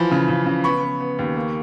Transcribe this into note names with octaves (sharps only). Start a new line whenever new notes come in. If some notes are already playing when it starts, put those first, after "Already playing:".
Already playing: E3 F3 B5
C#3
C#3
C#3
B3 B5 C#6
B3
B3
D#2
A#3